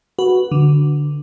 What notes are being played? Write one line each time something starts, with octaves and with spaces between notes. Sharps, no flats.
F#4 B4
D3